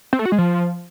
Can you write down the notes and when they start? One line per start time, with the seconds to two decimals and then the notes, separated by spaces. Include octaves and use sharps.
0.13 C4
0.19 A3
0.26 F#4
0.32 G#3
0.38 F3